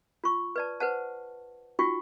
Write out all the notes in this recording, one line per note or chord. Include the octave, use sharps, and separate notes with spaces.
F4 C#6
B4 D5 A5
B4 C5 F#5 A5
D#4 F4 F#4 G5 C#6